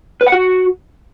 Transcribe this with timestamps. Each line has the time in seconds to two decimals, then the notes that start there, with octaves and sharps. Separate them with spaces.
0.21 B4
0.27 F#5
0.32 F#4